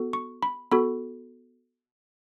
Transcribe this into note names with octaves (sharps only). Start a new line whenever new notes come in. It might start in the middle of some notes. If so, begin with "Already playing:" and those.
Already playing: B3 F#4 A4
C#6
B5
B3 F#4 A4 B5